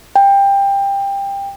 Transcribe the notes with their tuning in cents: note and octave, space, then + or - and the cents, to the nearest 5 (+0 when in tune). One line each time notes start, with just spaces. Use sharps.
G5 +20